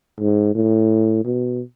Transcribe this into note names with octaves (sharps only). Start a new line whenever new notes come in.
G#2
A2
B2